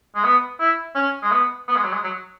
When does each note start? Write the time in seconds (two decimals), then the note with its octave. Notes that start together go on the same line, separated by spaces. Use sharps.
0.16 G#3
0.24 B3
0.60 E4
0.95 C#4
1.23 G#3
1.31 B3
1.68 B3
1.76 G#3
1.84 F#3
1.93 G#3
2.04 F#3